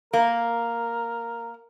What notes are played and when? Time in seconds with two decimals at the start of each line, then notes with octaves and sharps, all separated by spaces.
0.13 A#3 A#4